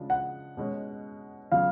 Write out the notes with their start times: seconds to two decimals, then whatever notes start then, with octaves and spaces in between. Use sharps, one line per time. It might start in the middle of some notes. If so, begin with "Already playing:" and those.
Already playing: C#3 F3 G#3 D4 F#4
0.10 F#5
0.57 B2 G#3 C#4
1.52 C#3 F#3 B3 F4 F5